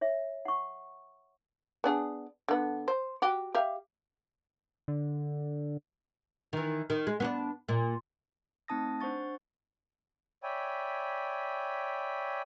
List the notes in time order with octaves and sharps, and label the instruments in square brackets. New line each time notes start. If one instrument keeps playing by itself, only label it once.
[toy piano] C#5 E5
F#5 C#6
[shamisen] B3 D4 G#4
D3 B3
C5
F#4 G4
G4 E5 F5
[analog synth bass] D3
[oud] D#3 E3
D#3
G#3
B3 C#4 D4
A#2
[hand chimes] A3 C4 D#4 A5 D#6 A#6
D4 C5 F#5 C#6 A6
[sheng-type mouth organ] C#5 D5 E5 G5 G#5 B5